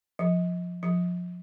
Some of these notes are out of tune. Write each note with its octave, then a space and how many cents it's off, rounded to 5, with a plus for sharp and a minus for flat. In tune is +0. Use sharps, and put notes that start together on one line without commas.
F3 +15
F3 +25